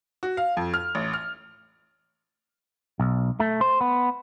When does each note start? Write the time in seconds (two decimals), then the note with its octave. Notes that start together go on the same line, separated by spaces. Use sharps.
0.23 F#4
0.37 F5
0.57 F2
0.74 F6
0.95 A1
1.14 F6
3.00 B1
3.40 A3
3.61 C5
3.81 B3